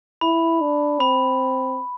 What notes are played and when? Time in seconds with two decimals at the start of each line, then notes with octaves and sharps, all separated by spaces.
0.21 E4 B5
0.61 D4
1.00 C4 B5